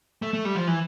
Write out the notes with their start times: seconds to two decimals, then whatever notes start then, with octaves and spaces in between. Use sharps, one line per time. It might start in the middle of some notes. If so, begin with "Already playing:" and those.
0.22 A3
0.33 A3
0.45 G3
0.56 F3
0.67 E3